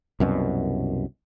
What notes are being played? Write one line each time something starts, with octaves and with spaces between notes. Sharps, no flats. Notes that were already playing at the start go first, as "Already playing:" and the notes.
C2 F#2 B2